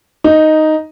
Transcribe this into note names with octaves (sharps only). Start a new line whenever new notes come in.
D#4